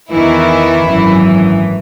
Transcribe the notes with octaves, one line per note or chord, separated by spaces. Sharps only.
E2 D#3 E3 E4
G#1 F#2 E3